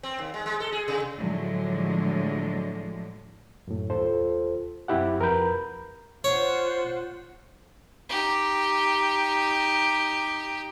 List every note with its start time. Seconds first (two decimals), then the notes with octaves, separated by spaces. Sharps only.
0.03 C4
0.18 D#2
0.34 G#3
0.46 G#3
0.60 A4
0.72 G#4
0.88 C3
1.18 A2 D3 F3 F#3 G#3
3.68 F#2 A2
3.90 D#2 F4 A4 C5
4.88 F#2 C4 E4 G4 F#5
5.20 F2 A#4 B4 A#5 B5 G6
6.24 F4 C5 C#5 F#5
8.09 D#4 G4